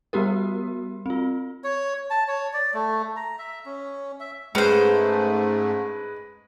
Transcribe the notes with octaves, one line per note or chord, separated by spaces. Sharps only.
G3 B3 F#4 G4 A#4
C4 F4
C#5
A5
C#5
D5
A3
A#5
E5
C#4
E5
G#2 G#3 A3 C#4 B4 C5